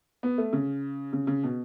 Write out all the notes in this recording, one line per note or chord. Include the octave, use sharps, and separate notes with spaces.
B3
A3
C#3
C#3
C#3
B2